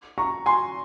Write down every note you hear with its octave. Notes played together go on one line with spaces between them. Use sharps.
A#5 C#6
G#5 C6